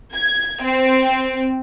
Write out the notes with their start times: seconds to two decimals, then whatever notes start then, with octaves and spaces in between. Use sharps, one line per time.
0.15 G#6
0.64 C4